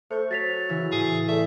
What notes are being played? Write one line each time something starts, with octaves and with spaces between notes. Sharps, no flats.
A3 C5 C#6 G6 C#7
F#3 A6 B6 F7
C#3 E3 E4
A2 G#4
A3 D5 E5